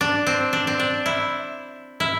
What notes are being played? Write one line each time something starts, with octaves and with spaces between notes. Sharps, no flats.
D4
C4
D4
C4
D4
E4
E4